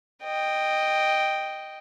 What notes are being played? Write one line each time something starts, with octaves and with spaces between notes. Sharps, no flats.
D#5 G5